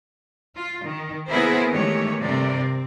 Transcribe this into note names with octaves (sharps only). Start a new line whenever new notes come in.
F4
D#3
A#3 B3 E4 G#4 A#4 C5
D#3 E3 G#3 A3 G4 C#5
G2 C3 G3 A3 A#4 D5
C4